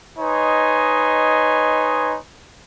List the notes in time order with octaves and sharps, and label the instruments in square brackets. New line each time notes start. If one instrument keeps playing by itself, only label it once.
[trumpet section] D#4 B4 C#5 D#5 G#5 C6